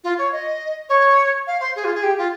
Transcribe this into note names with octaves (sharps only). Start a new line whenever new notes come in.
F4
C#5
D#5
C#5
F5
C5
G#4
F4
G#4
G4
F4